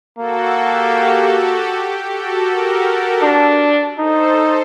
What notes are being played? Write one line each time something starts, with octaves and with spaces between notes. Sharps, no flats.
A#3 F#4 A4
G4
F#4
G4
G4
F#4 A4
G4 A#4
G4 A#4
D4
D#4 A4 C5